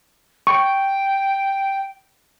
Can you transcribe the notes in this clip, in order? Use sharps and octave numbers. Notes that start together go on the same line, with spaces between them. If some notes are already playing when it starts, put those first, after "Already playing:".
G5 C#6